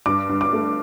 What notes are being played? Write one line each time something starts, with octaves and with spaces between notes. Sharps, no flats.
G2 D6
G2
D6
A3